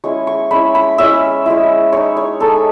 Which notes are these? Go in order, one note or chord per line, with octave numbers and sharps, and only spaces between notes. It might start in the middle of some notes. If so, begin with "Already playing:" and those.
G#3 C#4 E4 C#6
C#6
G#3 C#4 E4 B5
B5
G#3 C#4 E4 E5
G#3 C#4 E4
G#3 D#4 C#5
C#5
G#3 D#4 A4